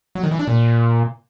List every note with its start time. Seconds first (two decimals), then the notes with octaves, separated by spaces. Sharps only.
0.15 F#3
0.23 D#3
0.31 E3
0.39 D4
0.47 A#2